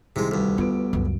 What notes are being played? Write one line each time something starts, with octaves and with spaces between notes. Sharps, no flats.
C2 C3 D#3 G#3
D2 G2
B3 F4 D7
C#2 F#2